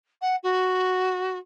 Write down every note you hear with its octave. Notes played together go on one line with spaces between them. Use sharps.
F#5
F#4